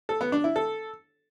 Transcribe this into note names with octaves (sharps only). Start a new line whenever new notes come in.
A4
B3
D4
E4
A4